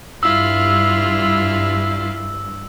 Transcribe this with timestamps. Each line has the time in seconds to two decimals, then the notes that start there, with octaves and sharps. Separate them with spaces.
0.23 G2 E4 F4 E6